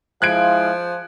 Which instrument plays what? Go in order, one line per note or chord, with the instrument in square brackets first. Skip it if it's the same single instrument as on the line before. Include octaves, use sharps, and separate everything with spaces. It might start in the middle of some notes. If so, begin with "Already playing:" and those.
[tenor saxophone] F3 [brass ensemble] G#3 E4 F5 [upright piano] F#6 G#6 D7